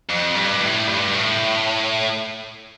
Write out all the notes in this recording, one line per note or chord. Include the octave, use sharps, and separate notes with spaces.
F2
G2
A2
G2
A2